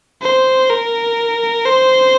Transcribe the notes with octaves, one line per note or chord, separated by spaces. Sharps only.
C5
A#4
C5